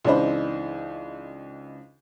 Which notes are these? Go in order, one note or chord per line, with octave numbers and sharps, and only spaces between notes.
C#2 E3 D4 D#4 C5 B5